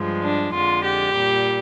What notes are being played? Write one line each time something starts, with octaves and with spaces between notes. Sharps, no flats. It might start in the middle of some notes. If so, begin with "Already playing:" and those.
Already playing: G2 F3 G#3
D4
F2 D3 G#3 F4
G4
A#2 G3